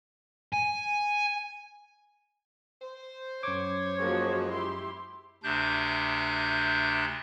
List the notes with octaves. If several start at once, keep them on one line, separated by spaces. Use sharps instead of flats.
G#5
C5
F#2 C#5 D6
F3 G#3 A#3 F#4
E4 G4 C6
D2 C3 D4 F#6 G6